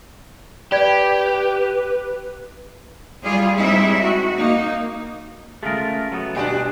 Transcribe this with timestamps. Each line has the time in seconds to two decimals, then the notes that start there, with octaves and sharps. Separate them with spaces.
0.72 G4 B4 D5 G#6
3.23 G3 F4 G#4
3.56 G3 G#3 C4 D#4 E4 E5
4.01 F#4
4.35 A#3 D#4
5.63 C#3 G#3 A3 F4 A#4
6.12 F#3 A3 B3
6.35 B2 G3 D4 G4 D#5 G#5